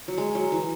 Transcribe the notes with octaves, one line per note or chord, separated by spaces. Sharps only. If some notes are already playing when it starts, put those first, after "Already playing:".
F#3
G#3
F#3
E3